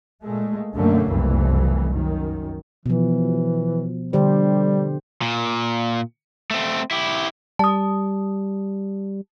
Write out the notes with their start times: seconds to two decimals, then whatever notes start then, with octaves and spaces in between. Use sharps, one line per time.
0.21 A#2 G#3 A3
0.74 F#2 B2 D3 F#3 A3 A#3
1.08 F#1 C2 F2 E3 A3
1.93 F#2 D#3
2.86 B2 E3 F3
4.13 D3 G3 G4 C5
5.22 A#2
6.51 A3 C4
6.91 E4 G4
7.59 G3 A5 D#6